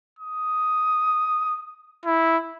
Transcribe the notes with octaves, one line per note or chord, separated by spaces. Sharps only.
D#6
E4